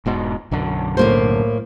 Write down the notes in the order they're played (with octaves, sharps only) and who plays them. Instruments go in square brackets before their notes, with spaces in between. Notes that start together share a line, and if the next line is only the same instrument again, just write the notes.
[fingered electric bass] E1 G#2 B2
B1 F#2 D3
[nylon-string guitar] A2 A#3 C5